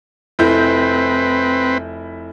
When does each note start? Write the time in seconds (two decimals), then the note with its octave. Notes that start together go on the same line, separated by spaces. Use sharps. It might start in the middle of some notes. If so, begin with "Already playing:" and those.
0.39 F1 C4 E4 B4 G6